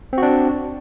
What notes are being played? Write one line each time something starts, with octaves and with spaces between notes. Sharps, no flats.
C4 D4 F#4